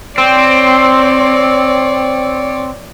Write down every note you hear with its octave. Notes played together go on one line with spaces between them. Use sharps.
C4 C#5 D5